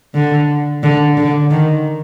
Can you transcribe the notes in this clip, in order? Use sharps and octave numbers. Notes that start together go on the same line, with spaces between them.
D3
D3
D3
D#3